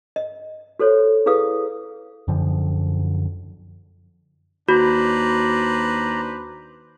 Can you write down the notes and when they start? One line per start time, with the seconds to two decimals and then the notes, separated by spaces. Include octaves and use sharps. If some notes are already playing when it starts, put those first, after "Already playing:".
0.16 D#5
0.80 F#4 A4 C5 C#5
1.26 E4 G#4 B4 F5 D#6
2.28 F#2 D3 F3
4.69 D#2 D4 F#4 B4 C5 D5 A#5